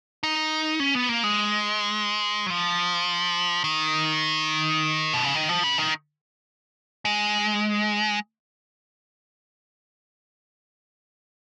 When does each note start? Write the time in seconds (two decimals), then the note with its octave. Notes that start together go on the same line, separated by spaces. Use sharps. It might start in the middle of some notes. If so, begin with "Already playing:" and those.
0.23 D#4
0.80 C#4
0.95 B3
1.09 A#3
1.23 G#3
2.47 F#3
2.50 F3
3.64 D#3
5.14 B2
5.24 C#3
5.34 D#3
5.49 F3
5.63 C#3
5.78 D#3
7.05 G#3